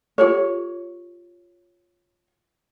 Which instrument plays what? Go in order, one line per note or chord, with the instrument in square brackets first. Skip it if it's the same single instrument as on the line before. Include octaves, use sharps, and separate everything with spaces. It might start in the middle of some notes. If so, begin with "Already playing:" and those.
[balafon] F4 G4 A4 [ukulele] C#5